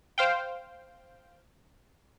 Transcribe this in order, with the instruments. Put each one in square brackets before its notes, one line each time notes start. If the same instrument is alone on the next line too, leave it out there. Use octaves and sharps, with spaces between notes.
[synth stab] C5 F5 G5